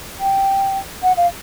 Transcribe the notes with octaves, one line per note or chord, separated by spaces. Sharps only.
G5
F#5
F5